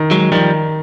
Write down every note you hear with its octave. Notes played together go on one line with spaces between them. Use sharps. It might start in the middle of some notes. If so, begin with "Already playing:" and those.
Already playing: D#3
F#3 G#3
D#3 F3 G3